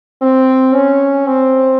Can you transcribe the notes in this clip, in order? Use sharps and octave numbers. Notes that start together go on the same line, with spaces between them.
C4
C#4
C4